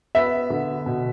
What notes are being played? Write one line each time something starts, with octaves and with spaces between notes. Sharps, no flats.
B3 E5
D3
B2